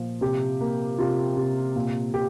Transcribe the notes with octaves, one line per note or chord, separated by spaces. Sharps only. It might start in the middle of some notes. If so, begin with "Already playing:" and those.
Already playing: A#2 F3
C3 G4
A#3
C3 F4
C3
A#2
G4